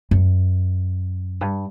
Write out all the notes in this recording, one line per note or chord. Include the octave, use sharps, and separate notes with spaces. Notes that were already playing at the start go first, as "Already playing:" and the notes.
F#2
G2